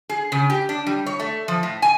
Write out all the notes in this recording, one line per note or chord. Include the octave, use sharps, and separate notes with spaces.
G#4
C#3
G4
D4
G3
C#5
A3
F3
A2
G#5